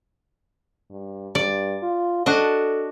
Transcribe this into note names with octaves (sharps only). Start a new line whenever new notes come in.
G2
G2 D5
F4
D4 F#4 A4 D#5